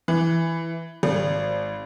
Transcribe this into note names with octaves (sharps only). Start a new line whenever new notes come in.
E3
G#1